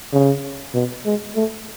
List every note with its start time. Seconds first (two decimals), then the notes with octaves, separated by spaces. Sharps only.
0.13 C#3
0.75 B2
1.06 G#3
1.36 A3